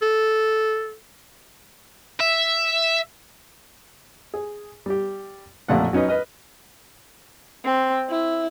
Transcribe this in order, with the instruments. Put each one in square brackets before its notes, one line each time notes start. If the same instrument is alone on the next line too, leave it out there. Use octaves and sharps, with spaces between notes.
[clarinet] A4
[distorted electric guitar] E5
[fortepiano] G#4
G3 G4
A1 F2 A#2 A3 F#5
F#3 C#4 D#4 B4 D#5
B4 D#5 F6
[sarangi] C4
E4